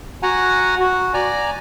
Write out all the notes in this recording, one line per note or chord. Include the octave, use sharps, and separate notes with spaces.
F#4 F#5 G#5 A#5
F#4
D5 G#5 A#5